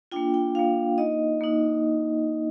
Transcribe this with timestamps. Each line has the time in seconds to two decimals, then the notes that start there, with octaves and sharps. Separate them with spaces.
0.11 A#3 D4 F4 G5
0.34 G5
0.55 A#3 D4 F4 F5
0.98 A#3 D#4 D#5
1.41 A#3 D#4